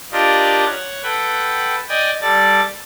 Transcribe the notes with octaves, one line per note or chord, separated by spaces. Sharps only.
D4 F4 G4 A#4 D5 D#5
C#5 F#5
A4 B4 F#5 G5
D5 D#5 G5 G#5 D#6
G3 A4 D5 A6